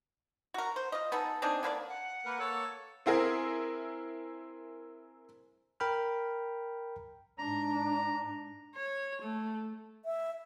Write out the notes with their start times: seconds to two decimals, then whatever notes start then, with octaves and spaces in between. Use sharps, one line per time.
0.54 F#4 A#4
0.76 C5
0.92 F4 D#5
1.12 B3 D#4 G#4 A4
1.42 C4 D4 D#4 G#4
1.63 D3 A#3 B4 D5
1.88 F#5
2.25 A#3 A#4 B4
2.40 A#3 A4 C#5
3.06 C4 E4 G#4 A#4
5.80 A#4 G5 B5 F6
7.39 G#2 D4 A#5
8.76 C#5
9.21 A3
10.05 E5